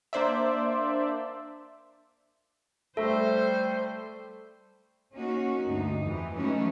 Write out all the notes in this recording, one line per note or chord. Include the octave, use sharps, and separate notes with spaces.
A#3 D4 C5 D5 E5
G3 A3 A4 C5 E5
A#3 C#4 D#4 F#4
D2 G2 D#4
F2 E3
E3 F#3 G#3 A3 C#4 D#4